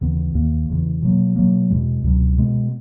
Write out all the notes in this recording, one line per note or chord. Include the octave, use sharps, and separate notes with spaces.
D#2 C#3 E3 B3
D#2 D#3 A#3
E2 C#3 E3
B2 F#3 A#3
B2 F#3 A#3
E2 B2 G#3
C#2 B2 F#3
B2 G#3 B3